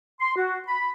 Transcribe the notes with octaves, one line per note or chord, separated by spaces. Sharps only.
C6
F#4
B5